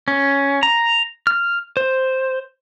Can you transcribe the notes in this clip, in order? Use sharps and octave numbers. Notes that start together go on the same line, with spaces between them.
C#4
A#5
F6
C5